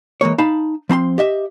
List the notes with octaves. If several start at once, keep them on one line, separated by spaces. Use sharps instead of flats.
E3 G#3 A#3 C#5
D#4 F5 A5 B5
F3 C4 A#5 C6
G4 D#5 E5